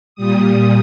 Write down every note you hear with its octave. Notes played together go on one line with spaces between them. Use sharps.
A#2 G3 D#6